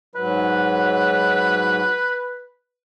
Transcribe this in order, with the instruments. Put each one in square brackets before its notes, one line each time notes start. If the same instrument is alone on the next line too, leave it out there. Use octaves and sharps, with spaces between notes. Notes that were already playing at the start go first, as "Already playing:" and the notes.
[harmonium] G#2 F#3 [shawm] B4